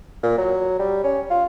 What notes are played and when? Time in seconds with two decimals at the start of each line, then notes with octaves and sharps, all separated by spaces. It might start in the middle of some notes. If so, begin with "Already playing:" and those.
0.23 A#2
0.38 F#3
0.79 G3
1.04 C#4
1.30 F4